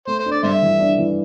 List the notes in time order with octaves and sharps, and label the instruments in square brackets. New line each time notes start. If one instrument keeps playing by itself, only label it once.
[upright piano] A3 [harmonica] C5
[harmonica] C5
[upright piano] D4
[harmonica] D5
[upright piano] G2 [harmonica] C5 E5
[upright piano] E3
D4
E3